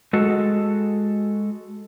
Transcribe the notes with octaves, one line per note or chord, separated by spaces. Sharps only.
G#3 F#4 A4